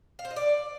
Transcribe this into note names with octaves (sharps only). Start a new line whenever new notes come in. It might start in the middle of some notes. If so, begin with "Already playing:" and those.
F5
C5
D#5
D5